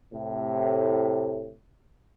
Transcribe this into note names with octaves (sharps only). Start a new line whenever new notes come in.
A2 C3